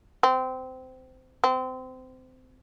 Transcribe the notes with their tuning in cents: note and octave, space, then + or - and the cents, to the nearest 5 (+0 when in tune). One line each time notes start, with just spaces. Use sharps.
C4 -20
C4 -25